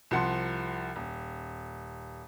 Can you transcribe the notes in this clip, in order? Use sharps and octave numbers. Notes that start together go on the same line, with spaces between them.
C2 F3 F#5 A5 C6
D#1